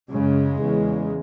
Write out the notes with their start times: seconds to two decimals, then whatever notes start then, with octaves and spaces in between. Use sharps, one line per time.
0.11 F#2 C#3 G#3
0.60 E2 C#3